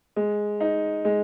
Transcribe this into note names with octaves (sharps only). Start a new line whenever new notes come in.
G#3
D#4
G#3